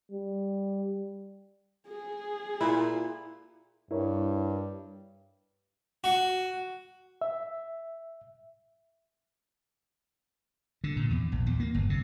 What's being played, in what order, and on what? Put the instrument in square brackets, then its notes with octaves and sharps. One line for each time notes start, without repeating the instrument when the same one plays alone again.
[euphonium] G3
[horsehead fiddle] G#4
[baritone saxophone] A#2 [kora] E4
[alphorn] G2 [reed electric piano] E4 A#4 C#5
[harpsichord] F#4
[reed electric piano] E5
[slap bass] D3
A#2
E2
A#1
E2
A#3
G1
C3